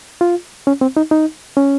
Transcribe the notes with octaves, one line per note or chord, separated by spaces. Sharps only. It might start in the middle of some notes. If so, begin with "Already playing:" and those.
F4
C#4
C4
D#4
D#4
C#4